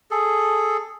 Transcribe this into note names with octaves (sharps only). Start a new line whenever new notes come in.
G#4 A4